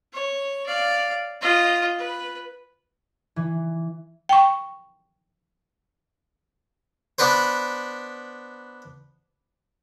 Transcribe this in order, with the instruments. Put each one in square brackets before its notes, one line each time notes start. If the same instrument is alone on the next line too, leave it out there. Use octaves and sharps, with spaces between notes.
[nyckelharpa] C#5
D5 F5
F4 D#5
B4
[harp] E3
[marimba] G5 C#6
[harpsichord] B3 D4 B4 C5